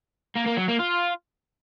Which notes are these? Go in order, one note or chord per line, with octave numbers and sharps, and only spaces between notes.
A#3
A#3
F#3
A#3
F4